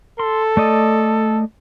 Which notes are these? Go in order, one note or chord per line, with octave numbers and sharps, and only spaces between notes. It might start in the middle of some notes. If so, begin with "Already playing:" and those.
A4 C6
A3 D5 D#5